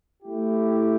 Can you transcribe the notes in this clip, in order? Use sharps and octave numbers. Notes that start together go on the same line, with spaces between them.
A3 E4 G4